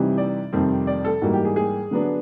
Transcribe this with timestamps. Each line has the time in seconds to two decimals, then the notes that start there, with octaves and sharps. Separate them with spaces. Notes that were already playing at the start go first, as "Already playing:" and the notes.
Already playing: C3 E3 G3 C4 D#4
0.18 D5
0.53 F2 C3 D#3 G3 C4
0.87 D5
1.05 A4
1.22 G#2 E3 G3 A#3 F#4
1.33 G4
1.45 G#4
1.56 G#4
1.91 D3 F#3 B3 D4